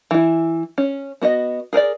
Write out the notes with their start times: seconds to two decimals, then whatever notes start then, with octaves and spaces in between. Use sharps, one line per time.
0.11 E3 E4
0.78 C#4
1.22 B3 F#4 C5 D#5
1.73 G#4 A#4 B4 D5